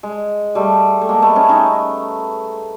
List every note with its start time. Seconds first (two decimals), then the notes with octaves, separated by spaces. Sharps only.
0.03 G#3
0.55 G3 A3
1.01 A3
1.09 G#3 A#3
1.22 A3 B3
1.36 B3 C#4
1.49 C#4 D#4